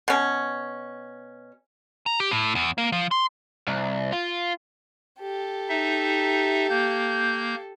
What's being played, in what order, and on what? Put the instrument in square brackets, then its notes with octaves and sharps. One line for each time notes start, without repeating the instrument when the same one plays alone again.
[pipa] B2 C#4
[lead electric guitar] A#5
G4
A2
E2
A#3
F3
C6
[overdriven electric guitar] C2
F4
[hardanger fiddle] G4 A4
[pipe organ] D#4 E5
A#3 G6